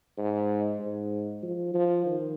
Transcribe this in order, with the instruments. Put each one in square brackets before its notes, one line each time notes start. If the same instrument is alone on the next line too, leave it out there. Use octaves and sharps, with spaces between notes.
[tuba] G#2
G#2
F3
F3
D#3